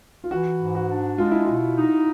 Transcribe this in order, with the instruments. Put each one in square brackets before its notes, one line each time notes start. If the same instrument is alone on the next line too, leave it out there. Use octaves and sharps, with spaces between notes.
[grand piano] F4
[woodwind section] E3 [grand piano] F#4
[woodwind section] G#2
[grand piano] F#4
[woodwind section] D4
[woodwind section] G#3 [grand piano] F4
[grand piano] E4
[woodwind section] B2 [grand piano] F4
[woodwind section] D#4